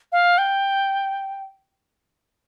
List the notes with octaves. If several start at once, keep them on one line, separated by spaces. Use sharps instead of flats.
F5
G5